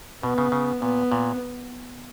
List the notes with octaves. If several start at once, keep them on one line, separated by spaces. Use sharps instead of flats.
B2 B3
C#3
C#3
A#2 B3
A#2